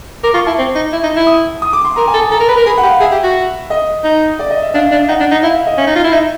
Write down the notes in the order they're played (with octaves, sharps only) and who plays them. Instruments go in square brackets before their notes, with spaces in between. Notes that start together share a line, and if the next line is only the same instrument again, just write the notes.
[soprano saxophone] A#4 [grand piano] D6
[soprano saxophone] F4 [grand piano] C#6
[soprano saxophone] E4 [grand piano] A5
[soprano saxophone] C4
D#4
E4
D#4
E4
[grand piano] D#6
D#6
D6
C6
[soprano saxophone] A#4 [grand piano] A#5
[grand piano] G#5
[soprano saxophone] A4
[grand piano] A5
[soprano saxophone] A4 [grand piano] A#5
[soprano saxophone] A#4
B4
A#4
[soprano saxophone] G#4 [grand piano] B5
[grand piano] F#5
[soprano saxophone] G4
[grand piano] F5
[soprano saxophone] G#4 [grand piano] E5
[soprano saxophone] G4
F#4
[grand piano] D#5
[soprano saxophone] D#4
[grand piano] D5
D#5
E5
[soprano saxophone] D4 [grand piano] F5
[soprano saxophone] D4
[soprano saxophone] D#4 [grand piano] F#5
[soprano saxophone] D4
D#4
[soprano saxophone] E4 [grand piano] F5
[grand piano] E5
D#5
[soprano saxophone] C#4 [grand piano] E5
[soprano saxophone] D#4
F4
E4
[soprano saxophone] D#4 [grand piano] E5